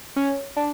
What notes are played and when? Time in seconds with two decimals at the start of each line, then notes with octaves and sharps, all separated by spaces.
0.16 C#4
0.56 D4